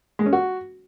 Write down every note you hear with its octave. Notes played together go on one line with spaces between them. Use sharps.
G#3
C#4
F#4